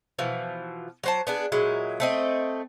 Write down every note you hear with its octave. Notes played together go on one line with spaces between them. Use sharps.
B2 E3 F3
F#3 C5 A5
B3 D4 G#4
A#2 F#3 G#3 E4
A3 C4 D#5